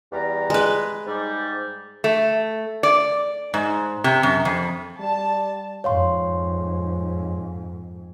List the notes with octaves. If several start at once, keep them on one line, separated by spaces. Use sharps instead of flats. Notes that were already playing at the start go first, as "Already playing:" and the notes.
E2 G3 A#5
G#3 B4
G#2 G3
A3
D5
G#2
C3
F#2
F2
G3 A5
F2 G#2 C#5 F5 C6